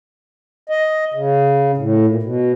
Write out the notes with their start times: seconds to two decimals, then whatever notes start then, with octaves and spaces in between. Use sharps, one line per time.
0.69 D#5
1.14 C#3
1.77 A2
2.06 A#2
2.23 B2